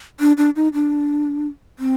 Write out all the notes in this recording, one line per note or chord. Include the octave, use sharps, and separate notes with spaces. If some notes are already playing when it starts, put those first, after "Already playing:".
D4
D4
D#4
D4
C4